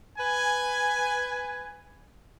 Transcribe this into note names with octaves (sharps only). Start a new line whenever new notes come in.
B4 G#5